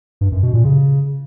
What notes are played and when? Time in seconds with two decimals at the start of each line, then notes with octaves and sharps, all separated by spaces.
0.21 G2
0.32 F#2
0.43 B2
0.54 A#2
0.64 C#3